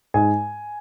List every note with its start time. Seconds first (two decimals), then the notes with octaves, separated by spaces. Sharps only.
0.14 G#2 G#5